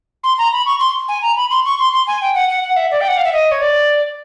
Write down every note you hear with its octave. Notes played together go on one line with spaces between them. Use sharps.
C6
A#5
B5
C#6
C6
G#5
A#5
B5
C6
C#6
C6
C6
G#5
G5
F#5
F#5
F#5
E5
D5
G5
F#5
F5
E5
D#5
C#5
D5